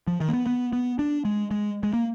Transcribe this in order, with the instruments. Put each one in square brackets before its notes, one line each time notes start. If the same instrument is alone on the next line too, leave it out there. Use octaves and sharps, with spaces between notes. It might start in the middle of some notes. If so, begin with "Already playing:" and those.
[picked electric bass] F3
D#3
A#3
B3
B3
B3
D4
G#3
G#3
G#3
A#3